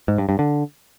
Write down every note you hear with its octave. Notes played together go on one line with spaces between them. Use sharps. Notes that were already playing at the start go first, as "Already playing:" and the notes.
G#2
G2
G2
D3